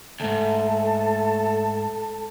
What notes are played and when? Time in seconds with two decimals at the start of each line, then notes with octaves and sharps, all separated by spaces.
0.20 D2 G#2 A3 A4 A5